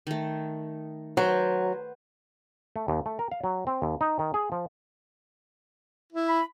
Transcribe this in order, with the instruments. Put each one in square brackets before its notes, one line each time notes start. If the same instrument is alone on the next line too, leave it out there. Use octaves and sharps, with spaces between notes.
[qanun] D#3 A3
[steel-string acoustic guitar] F#3 [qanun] B4 C5
[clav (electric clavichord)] A3
D#2
A3
A#4
F5
F#3
C4
D#2
D#4
D#3
G#4
F3
[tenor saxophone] E4
[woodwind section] B5